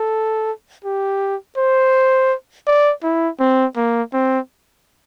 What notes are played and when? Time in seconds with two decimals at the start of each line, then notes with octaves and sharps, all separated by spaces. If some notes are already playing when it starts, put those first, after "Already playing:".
Already playing: A4
0.85 G4
1.57 C5
2.67 D5
3.03 E4
3.40 C4
3.77 A#3
4.13 C4